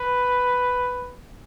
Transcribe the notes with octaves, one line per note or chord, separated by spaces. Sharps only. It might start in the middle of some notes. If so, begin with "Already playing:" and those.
Already playing: B4